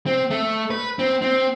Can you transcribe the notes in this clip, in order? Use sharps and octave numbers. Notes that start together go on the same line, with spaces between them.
C4
A3
B4
C4
C4